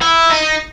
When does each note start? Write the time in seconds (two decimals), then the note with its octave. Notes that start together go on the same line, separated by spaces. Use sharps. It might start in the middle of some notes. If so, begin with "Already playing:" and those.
0.02 E4
0.30 D#4